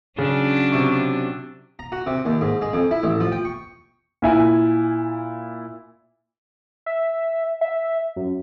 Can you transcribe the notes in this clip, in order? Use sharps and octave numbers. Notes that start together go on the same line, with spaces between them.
C#3 F#3 C#4 D4
C3 E5 C#6
A#5
F#4
C3
D#2
G#2
G#3
F2
E4
A1
F3
G5
C#6
A#2 E4 G#5
E5
E5
F#2